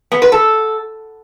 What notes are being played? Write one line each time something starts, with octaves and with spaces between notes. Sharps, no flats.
B3
B4
A4